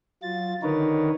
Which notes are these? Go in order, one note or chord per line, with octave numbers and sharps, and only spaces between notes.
F#3 F4 A6
D3 D#3 D#4 A#4 B4 C#5